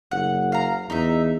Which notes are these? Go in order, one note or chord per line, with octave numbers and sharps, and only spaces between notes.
F#1 F#5
F5 A#5
E2 D#4 E5